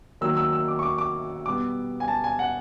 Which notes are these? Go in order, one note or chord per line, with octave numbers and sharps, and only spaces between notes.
D#3 F#3 A#3 E6
E6
E6
D6
C#6
D6
D6
B2 G3 B3 D6
G#5
A5
G#5
F#5